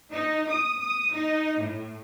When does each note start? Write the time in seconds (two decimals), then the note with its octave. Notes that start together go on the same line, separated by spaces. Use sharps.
0.11 D#4
0.50 D#6
0.80 D#6
1.12 D#4
1.60 A2